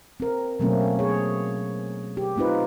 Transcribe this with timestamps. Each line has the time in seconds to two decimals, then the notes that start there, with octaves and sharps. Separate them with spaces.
0.20 C4 A#4
0.59 B2 F#3 A3 A#3 C4 C#4
0.99 G#4 C#5
2.17 G4
2.37 A3 C4 D#4 F4 B4